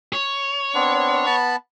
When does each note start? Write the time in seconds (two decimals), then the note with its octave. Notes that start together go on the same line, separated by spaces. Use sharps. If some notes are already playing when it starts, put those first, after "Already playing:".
0.13 C#5
0.74 B3 C4 D4
1.26 B3 A5 B5